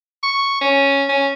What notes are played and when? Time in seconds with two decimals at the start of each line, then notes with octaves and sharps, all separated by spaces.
0.23 C#6
0.61 C#4
1.09 C#4